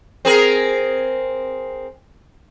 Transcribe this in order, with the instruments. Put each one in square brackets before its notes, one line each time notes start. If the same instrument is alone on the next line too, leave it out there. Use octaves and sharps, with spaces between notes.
[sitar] C4 G#4 A#4